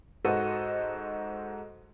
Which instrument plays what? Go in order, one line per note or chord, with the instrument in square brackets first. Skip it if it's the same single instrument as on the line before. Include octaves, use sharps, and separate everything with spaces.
[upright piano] G#2 F#4 A4 C5 D#5 D#7